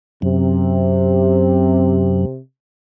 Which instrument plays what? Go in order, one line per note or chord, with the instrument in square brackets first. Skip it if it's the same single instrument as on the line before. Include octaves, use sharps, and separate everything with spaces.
[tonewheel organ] F#2 [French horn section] C3